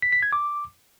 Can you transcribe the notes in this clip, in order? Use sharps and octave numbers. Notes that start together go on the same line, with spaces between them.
B6
B6
G#6
D6